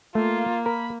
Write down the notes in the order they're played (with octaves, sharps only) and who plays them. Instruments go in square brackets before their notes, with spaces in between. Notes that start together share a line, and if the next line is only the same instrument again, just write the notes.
[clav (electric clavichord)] A3 [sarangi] A#3 [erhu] F4
[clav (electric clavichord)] A#4 [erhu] B5